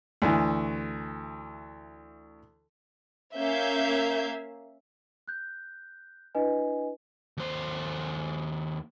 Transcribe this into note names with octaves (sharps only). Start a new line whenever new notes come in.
D2 E3
A#3 C#4 E5 F5 G6 G#6
F#6 G6
D4 E4 B4 D#5 G#5
D#2 C5